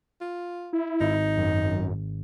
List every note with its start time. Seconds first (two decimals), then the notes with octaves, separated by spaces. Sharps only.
0.21 F4
0.73 E4
1.01 G#1 D#4
1.37 F#2